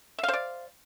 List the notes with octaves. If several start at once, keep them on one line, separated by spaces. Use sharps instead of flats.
C5 D5 E5 F5